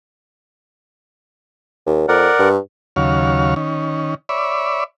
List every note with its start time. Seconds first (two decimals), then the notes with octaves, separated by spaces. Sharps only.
1.86 D#2
2.08 F2 A#4 D5 F#5
2.39 G2
2.96 D#2 C#3 F#3 C#5 F5
3.56 D#3 C#4
4.29 C#5 D5 E5 B5